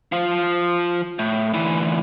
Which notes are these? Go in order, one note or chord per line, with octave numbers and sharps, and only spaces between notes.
F3 F4
A2
D2 E3